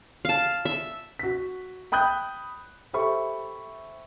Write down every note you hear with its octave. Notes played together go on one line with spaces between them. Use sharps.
F5 A5
E5
F#4 B6
G5 B5 D#6 F#6 G6
G4 A4 C5 E5 B5 C#6